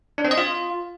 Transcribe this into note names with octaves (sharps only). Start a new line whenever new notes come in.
D4
C4
D#5
F4